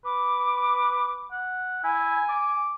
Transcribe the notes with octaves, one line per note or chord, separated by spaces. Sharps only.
B4 D6
F#5
E4 G#5
D6